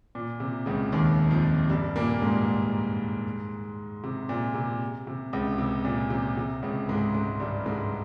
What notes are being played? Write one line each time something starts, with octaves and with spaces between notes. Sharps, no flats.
A#2
C3
C#2 C#3
D#2 D#3
F2 F3
G2 G3
A#2 A#3
G#2 G#3
C3
A#2
C3
C3
C#2 C#3
C3
A#2
C3
C3
C#2 C#3
G#2 G#3
G#2 G#3
G2 G3
G#2 G#3